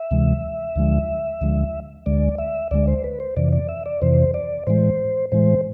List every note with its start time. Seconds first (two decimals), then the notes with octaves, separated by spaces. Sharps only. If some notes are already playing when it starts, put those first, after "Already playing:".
Already playing: E5
0.11 D2 C3 E3 G#3
0.76 D2 D3 F3 G#3
1.41 D2 D3 F3 G#3
2.06 D2 D3 G#3 D5
2.38 E5
2.71 D2 D3 G#3 D5
2.88 C5
3.04 B4
3.20 C5
3.36 F2 C3 E3 D5
3.53 D5
3.69 E5
3.86 D5
4.02 F2 C3 E3 C5
4.34 D5
4.67 A2 E3 G#3 C5
5.32 A2 E3 G#3 C5